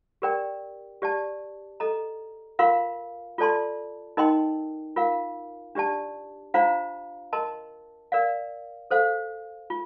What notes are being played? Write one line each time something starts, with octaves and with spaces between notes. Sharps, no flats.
G4 A#4 D5 G5
G4 D5 A5
A4 D#5 A#5
F4 A#4 F5 C6
F4 A4 D5 A5 C6
D#4 A#4 D#5 G5 C6
F4 A#4 F5
D4 G4 D5 A5
D4 F4 C5 F5 A#5
A#4 D#5 A5 C6
A#4 D5 F5
A4 C5 F5
F4